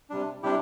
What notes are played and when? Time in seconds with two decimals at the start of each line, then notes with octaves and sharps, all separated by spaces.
0.10 C3 G3 D4
0.43 C3 G3 D4 E4 G4